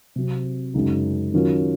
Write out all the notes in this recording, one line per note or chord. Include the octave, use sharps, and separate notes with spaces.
C3 F#3 C4
F#2 C#3 G#3 D#4
D#3 F#3 C#4 F4 A#4